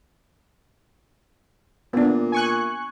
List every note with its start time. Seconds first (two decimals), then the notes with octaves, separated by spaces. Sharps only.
1.93 A#2 B3 D4
2.32 G#5 C#6 F#6